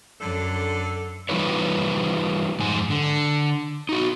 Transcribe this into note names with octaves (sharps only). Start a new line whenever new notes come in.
F#2 D3 D4 A4
E3 G3 D#4 F4 B4 C#5
F2 G#2 G#5
D3
D#4 F#4